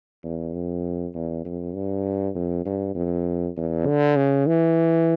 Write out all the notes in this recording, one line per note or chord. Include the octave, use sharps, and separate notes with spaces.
E2
F2
E2
F2
G2
F2
G2
F2
E2
D3
C#3
E3